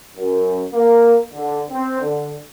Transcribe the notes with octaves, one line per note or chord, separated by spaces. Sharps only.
F#2
A#3
D3
C4
D3